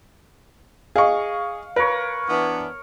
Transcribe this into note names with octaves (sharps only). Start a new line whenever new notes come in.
G#4 D#5 F5 C#6
A#4 B4 C#5
E3 B3 D4